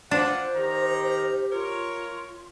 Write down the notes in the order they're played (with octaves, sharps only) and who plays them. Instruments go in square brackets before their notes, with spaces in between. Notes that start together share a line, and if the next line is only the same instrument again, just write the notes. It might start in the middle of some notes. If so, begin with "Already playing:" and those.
[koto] D4 [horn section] F4 B4 F#5 [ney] C5
[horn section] D#3 A#5 [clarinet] G4
[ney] F4 [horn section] A#4 C#5